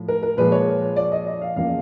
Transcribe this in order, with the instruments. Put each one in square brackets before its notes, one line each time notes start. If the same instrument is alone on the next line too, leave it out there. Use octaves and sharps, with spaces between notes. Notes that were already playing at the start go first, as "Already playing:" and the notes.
Already playing: [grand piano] A2 F3
A#4
A#4
A#2 F3 G#3 B4
C#5
D5
D#5
D#5
F5
E2 C#3 F3 A#3 F5